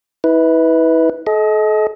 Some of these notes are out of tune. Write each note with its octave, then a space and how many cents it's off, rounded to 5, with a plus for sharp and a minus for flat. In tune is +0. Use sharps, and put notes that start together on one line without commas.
E4 -35 B4 +0
A4 -40 D#5 +25